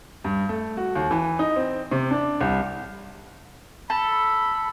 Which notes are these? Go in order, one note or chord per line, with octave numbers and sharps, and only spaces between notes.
G2
A3
F#4
D#2
E3
D#4
C4
C3
D4
C2
A4 B5